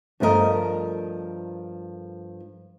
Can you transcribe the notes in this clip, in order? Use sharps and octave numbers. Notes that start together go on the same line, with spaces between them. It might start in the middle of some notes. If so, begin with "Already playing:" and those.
G2 F3 A3 C4 A#4 D#5